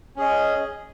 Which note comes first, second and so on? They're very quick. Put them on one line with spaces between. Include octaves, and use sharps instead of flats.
C#4 G#4 D#5